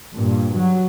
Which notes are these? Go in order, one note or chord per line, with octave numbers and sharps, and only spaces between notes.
G2 A#2
F#3